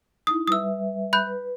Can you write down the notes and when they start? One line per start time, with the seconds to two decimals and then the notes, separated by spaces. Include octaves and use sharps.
0.27 D#4 E4 D#6
0.47 G3 B4 E5 D#6 E6
1.13 B5 F#6 G6
1.27 B4